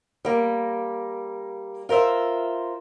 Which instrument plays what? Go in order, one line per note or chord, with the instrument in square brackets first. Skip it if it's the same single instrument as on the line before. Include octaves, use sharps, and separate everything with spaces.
[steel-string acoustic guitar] G3 A#3
F4 A#4 C5 E5